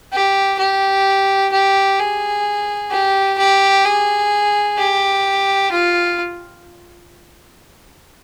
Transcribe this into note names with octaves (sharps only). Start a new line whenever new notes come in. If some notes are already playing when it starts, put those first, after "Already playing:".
G4
G4
G4
G#4
G4
G4
G#4
G4
F4